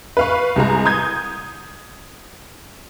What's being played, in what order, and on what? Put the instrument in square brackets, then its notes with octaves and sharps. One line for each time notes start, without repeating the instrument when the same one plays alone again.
[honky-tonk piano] B4 F5 C#6
C2 G#3 A#5
D#6 G6 G#6